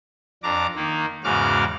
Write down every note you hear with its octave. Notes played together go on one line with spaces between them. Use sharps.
F2 D4 A#5 D6
D#3 A#3
E2 G#2 C#3 F#4 D6 F6